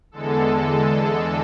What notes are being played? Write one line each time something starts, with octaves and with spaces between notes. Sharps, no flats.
E2 D3 G#3 A4